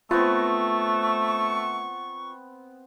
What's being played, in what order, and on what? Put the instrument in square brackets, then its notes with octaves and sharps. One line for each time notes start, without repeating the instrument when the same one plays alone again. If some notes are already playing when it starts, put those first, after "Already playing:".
[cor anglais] A3 [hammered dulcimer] B3 C4 [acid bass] F4 [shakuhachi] C#6